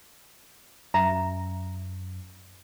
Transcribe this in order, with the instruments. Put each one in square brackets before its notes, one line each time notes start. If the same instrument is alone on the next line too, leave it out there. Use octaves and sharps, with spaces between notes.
[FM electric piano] F#2 [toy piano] E5 A#5